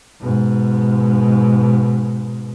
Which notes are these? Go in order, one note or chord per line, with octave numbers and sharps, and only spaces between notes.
G#2 B2